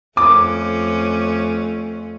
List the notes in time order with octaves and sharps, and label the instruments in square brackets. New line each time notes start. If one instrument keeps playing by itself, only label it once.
[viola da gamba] F2 A3 C#4 [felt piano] D6